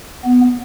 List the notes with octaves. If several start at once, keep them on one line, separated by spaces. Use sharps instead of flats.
B3